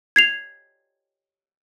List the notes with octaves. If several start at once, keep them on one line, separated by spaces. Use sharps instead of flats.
G#6 C7 F7